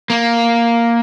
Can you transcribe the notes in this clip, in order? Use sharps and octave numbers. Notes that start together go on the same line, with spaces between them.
A#3